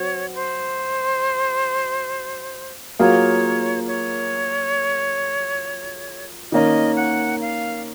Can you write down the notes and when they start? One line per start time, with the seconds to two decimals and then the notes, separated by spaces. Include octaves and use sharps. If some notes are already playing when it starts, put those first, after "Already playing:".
Already playing: F#3 C4 F#4 C#5
0.34 C5
2.99 F#3 A#3 F4 G#4 C#5
3.87 C#5
6.52 D#3 A#3 C#4 D#5
6.96 F#5
7.41 F5